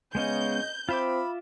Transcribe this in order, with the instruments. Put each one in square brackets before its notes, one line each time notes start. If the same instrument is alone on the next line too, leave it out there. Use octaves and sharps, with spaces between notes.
[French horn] C#3 [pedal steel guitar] G#3 B3 C#4 [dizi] D#5 [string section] G6
[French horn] C4 [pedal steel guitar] F4 E5 D6 [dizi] B5